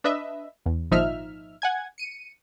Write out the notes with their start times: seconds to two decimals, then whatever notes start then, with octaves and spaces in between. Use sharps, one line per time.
0.04 D4 B4 D#5 E5
0.66 E2
0.91 G#1 A#2 F3 D#4 E5 F6
1.62 F#5 G#5 G#6
1.98 C#7 D#7